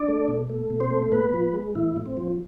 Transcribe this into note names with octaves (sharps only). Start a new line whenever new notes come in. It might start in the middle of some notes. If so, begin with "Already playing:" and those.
Already playing: D4 D5
A3
B2
A3
B2
C4 C5
A3
A2 B3 B4
F3
G#3
A2 E3 E4
A2
C4
F3